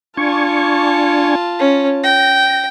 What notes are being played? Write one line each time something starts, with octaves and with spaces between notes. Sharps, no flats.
D4 F4 G#5 A5 C#6
C#4
G5 A#6